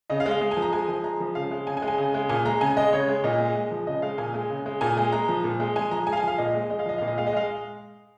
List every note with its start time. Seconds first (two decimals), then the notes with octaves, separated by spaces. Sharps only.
0.10 C#3 D#5
0.20 F5
0.26 G#3
0.31 F5
0.41 G#3
0.51 G#5
0.57 F3
0.62 A#5
0.73 G#3 G#5
0.88 F3
1.04 G#3 A#5
1.20 F3
1.35 C#3 F5
1.51 G#3
1.67 C#3 G#5
1.77 G#5
1.82 G#3
1.88 G#5
1.98 C#3
2.14 G#3
2.29 A#2 G#5
2.45 G#3 A#5
2.61 C#3 G#5
2.77 G#3 D#5
2.93 C#3 C#5
3.08 G#3
3.23 A#2 D#5
3.39 G#3
3.55 G#3
3.71 F3
3.87 C#3 D#5
4.02 G#3 F5
4.18 A#2 G#5
4.34 G#3
4.50 C#3
4.66 G#3
4.81 A#2 G#5
4.97 G#3
5.12 G#3 A#5
5.28 F3
5.44 A#2
5.60 G#3
5.76 G#3 G#5
5.91 F3 A#5
6.07 G#3 G#5
6.13 F5
6.17 G#5
6.23 F3 F5
6.38 A#2 D#5
6.54 G#3
6.70 G#3 D#5
6.79 F5
6.86 F3 D#5
6.98 A#2 F5
7.07 D#5
7.17 G#3 F5
7.27 D#5
7.33 G#3 F5